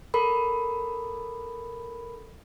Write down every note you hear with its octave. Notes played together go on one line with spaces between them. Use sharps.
A4 A#4 B5